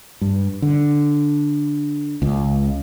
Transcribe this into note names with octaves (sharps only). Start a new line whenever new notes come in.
G2
D3
C#2